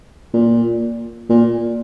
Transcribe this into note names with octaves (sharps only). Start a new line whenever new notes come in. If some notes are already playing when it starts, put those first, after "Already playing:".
A#2
A#2